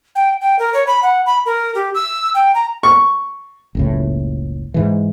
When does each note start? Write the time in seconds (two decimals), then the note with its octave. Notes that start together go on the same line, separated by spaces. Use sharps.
0.15 G5
0.41 G5
0.59 A#4
0.74 C#5
0.87 B5
1.03 F#5
1.26 B5
1.46 A#4
1.75 G4
1.95 E6
2.35 G5
2.54 A#5
2.83 C#6
3.75 F#1 C#2 A2
4.74 G#2 E3